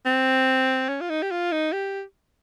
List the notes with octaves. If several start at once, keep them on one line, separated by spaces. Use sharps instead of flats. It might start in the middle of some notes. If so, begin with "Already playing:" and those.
C4
C#4
F4
D#4
G4
F4
D#4
G4